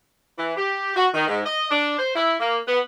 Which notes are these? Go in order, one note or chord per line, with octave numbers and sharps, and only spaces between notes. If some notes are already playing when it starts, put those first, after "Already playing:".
E3
G4
F#4
D#3
G#2
D#5
D4
C5
E4
A#3
B3